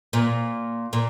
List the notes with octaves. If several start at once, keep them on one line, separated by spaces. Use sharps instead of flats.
A#2
A#2